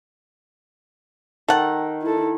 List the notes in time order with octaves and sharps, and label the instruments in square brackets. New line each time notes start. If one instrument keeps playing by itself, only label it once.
[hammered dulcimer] D#3 [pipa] A4 F#5
[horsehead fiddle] E4 A4